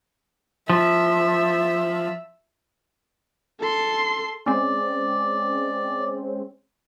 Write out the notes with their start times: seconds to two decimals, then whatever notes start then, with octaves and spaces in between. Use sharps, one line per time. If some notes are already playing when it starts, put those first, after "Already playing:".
0.70 F3 E5
3.60 A4 C6
4.46 G#3 C4 C#4 D5